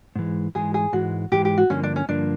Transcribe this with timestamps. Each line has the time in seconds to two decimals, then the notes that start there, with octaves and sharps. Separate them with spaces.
0.15 G#2 E3 G#3
0.55 G#2 E3 G#3 G#4
0.74 G#4
0.93 G#2 E3 G#3 F#4
1.32 G#2 E3 G#3 G4
1.45 G4
1.58 F#4
1.70 G2 D3 F3 A#3 C#4
1.83 D4
1.96 C#4
2.09 G2 D3 F3 A#3 D4